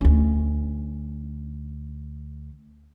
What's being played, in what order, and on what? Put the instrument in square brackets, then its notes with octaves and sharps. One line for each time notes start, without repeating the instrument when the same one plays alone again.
[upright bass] D2 C#4